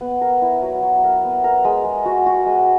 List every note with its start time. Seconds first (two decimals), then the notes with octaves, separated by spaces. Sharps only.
0.01 B3
0.21 A#4
0.42 E4
0.62 F#3
0.83 F#3
1.03 A#4
1.24 B3
1.44 A#4
1.65 G#3
1.85 G#3
2.05 F#4
2.26 F#4
2.46 G#3